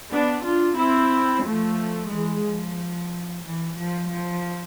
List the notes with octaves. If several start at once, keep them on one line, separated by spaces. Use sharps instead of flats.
B3 D4
D4 F4
C4 E4
F3 A3
E3 G#3
F3
E3
F3
F3